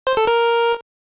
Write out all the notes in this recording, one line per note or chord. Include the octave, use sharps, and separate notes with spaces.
C5
A4
A#4